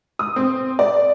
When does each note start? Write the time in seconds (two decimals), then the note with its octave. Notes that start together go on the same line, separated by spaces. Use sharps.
0.19 D#6
0.36 C4
0.79 D5